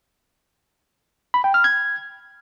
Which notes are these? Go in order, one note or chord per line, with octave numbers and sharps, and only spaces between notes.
B5
G5
F6
G#6